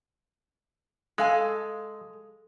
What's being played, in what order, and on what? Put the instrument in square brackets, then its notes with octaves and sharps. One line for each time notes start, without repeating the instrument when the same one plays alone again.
[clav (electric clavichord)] G#3 [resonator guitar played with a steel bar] A4 F5 G#5